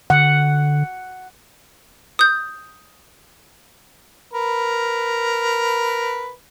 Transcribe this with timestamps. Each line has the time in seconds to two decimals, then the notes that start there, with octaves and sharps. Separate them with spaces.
0.10 D3 F#5
2.19 D#6 G6
4.33 A#4 B4